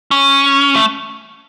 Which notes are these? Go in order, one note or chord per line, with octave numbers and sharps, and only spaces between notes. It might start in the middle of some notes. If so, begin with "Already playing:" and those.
C#4
A3